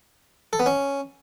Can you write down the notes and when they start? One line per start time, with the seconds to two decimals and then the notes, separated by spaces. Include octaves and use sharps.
0.53 A4
0.60 B3
0.66 C#4